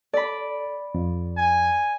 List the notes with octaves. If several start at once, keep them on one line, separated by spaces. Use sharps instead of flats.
A4 D5 B5
F2
G#5